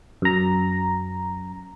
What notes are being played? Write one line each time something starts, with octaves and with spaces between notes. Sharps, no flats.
F#2 A#5